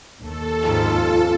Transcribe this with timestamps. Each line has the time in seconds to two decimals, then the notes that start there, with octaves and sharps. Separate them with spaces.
0.22 D#2 A4
0.63 F2 G#2 F4